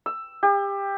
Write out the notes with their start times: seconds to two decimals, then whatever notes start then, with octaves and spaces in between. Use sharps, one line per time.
0.06 E6
0.43 G4